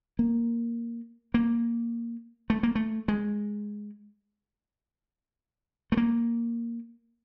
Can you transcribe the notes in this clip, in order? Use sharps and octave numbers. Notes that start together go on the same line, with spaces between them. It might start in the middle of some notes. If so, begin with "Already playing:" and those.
A#3
A#3
A3
A#3
A3
G#3
A3
A#3